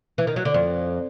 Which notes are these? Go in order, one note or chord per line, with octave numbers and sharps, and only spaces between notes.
E3
D#3
F#3
D3
F2